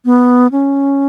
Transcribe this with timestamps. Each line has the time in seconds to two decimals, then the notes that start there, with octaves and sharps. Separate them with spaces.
0.05 B3
0.52 C#4